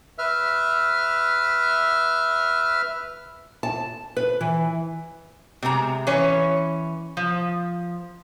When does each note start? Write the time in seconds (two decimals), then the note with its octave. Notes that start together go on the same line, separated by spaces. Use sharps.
0.18 B4 E5 F6
3.63 A5
4.17 B4
4.41 E3
5.63 C3 G#3 G#4 A#5
6.07 E3 C#4 B4 C#5
7.17 F3